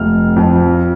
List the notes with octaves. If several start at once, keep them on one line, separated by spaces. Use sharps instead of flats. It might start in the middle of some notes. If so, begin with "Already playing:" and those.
Already playing: F1 F6
F2 F3